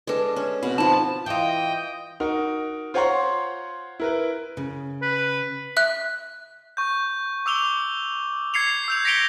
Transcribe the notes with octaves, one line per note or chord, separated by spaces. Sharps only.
G#3 D4 A4 B4
C#4
B2 C4 F#7
F3 B3 D#4 A5 B5
E3 F4 D#5 G5
D#4 F#4 A#4
F4 C5 C#5 F#5 A#5 C6
E4 A#4 B4
C#3
B4
E5 F#6
C#6 G6
D6 E6 F7 G7
G#6 C7 C#7 F7
E6 G6 F7
A#6 B6 C#7 D7 F7 G7